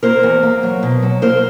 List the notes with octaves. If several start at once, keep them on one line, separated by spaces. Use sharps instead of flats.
A#3 A#4 C5
E2
A#3
F#3
B2
F#3
A#3 A#4 C5